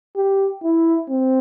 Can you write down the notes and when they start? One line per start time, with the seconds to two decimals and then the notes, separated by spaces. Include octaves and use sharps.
0.17 G4
0.64 E4
1.10 C4